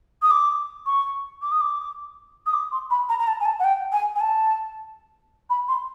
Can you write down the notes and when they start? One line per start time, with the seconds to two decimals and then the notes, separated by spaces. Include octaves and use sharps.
0.22 D#6
0.30 D6
0.86 C#6
1.42 D6
1.51 D#6
1.61 D6
2.46 D#6
2.53 D6
2.72 C6
2.90 B5
3.09 A#5
3.19 A#5
3.27 A5
3.40 G#5
3.45 A5
3.59 F#5
3.64 G5
3.92 G#5
4.16 G#5
4.20 A5
5.50 B5
5.68 C6